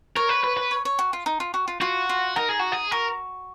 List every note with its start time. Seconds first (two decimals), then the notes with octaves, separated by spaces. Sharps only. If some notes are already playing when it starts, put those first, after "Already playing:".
0.16 A#4 C#5
0.29 B4
0.44 B4
0.57 B4
0.71 C#5
0.85 C#5
0.99 F#4
1.13 F4
1.26 D#4
1.40 F4
1.54 F#4
1.68 F4
1.81 F4 F#4
2.09 F4
2.36 D#4 A#4
2.49 G#4
2.59 F#4
2.72 G#4
2.91 F#4 A#4